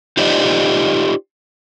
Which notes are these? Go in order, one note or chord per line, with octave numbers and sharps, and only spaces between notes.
D#4 F4 G4 C5 D5 D#5